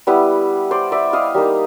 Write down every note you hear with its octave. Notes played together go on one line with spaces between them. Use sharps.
G3 B3 E4
C5 D5
D5 E5
D#5 F5
G3 A#3 D#4